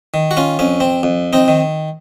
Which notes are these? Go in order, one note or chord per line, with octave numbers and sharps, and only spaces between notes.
D#3
F#4
C#4 F4
F2 C#4
C4
F2
C4 D#4
D#3